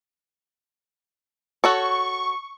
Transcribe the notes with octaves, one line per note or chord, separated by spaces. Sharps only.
F#4 A4 C#5 C#6